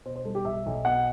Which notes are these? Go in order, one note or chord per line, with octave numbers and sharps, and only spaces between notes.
B2 C5
C5
G3 A4
G4
B1 E5
B1
B2 F#5